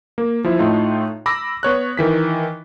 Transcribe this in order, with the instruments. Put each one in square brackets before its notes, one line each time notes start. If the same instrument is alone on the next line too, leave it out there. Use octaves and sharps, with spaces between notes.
[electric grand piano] A#3
F3 E4
A2 A3 D#4 F4
B5 D6 E6 A#6
B3 C#5 F#6
D#3 E3 B6